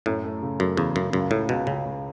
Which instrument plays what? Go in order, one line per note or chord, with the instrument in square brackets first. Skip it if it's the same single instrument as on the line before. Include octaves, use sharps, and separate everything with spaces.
[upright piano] F#2 [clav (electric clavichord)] A2
[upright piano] A3
C#3
[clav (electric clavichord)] F#2 [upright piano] A3
[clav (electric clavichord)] E2 [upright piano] C#3
[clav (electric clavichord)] F#2 [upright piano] C#3
[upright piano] C#2 [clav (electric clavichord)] F#2
[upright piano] C#2 [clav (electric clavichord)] A2
[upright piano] C#2 [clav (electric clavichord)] B2
[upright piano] C#2 [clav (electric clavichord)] C#3
[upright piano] C#2